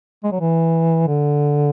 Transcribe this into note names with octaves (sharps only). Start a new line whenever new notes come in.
G#3
F#3
E3
D3